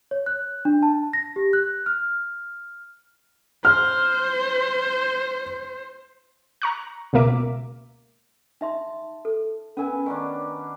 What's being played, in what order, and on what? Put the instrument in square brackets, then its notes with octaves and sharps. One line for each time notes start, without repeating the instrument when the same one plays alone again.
[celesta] C#5
F#6
D4
A5
A#6
G4
F#6
F6
[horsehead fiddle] C5 [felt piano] F6
[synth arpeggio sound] A#5 C#6 F#6
C#2 B2 A#3 A#4 E5 D6
[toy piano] D#4 E5 C6 [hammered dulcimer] A5
[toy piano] A4
[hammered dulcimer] B3 E4 G#5 [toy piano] C#4 A#4
[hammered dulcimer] D#3 C#4 D4 [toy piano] G#5